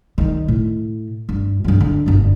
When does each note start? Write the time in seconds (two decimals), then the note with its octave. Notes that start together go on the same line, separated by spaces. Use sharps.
0.18 D#3 G3
0.48 A2
1.29 G2
1.64 G2 F#3
1.80 D3
2.06 G1 F#2